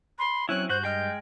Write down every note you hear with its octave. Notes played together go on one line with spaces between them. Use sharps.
B5 C6
F#3 C4 C#4 E4 C#5 F#6
G2 F#4 C5 F#6 G6
G#3 D#5 G5 F6